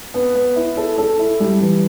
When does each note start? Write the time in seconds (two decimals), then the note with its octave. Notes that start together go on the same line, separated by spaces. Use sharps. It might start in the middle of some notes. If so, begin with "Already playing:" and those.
0.14 B3
0.35 B3
0.56 E4
0.77 A4
0.98 A4
1.19 E4
1.40 G3
1.61 E3